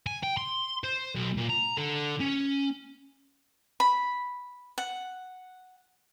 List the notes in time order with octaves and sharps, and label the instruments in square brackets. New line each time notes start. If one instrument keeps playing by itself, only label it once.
[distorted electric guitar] G#5
G5
C6
C5
B1
A#2
A#5
D3
C#4
[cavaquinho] B5
F#5